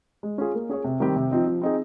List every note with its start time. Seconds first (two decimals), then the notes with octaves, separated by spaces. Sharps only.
0.23 G#3
0.38 C#4 F4 G#4
0.55 A#3
0.70 C#4 G#4 C#5
0.84 C3
1.00 D#3 G3 C4 G4
1.16 C3
1.31 F3 C4 D#4
1.47 F3
1.62 C4 D#4 G#4